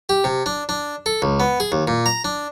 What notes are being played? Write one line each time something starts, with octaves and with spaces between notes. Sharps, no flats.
G4
C3
D4
D4
A4
C#2
B3
G#4
D#2
A#2
A#5
D4